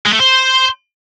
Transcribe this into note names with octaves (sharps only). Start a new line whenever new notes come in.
G#3
A3
C5